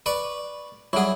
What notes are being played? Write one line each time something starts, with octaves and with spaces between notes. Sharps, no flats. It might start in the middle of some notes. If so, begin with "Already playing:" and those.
B4 D5 C#6
F#3 G3 E4 G#4 F#5